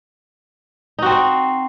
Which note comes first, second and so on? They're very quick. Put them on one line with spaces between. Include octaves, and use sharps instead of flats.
D#4 F#4 C4